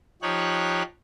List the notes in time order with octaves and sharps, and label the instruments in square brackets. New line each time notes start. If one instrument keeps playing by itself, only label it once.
[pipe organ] F3 D#4 G4 C#5 F#6